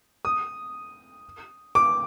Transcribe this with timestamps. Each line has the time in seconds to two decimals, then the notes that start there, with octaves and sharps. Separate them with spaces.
0.25 D#6
1.75 D6